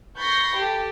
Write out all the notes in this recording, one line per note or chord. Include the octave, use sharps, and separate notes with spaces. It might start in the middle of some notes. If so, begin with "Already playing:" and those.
B5 C#6 G6 A6 A#6 C7
G4 A4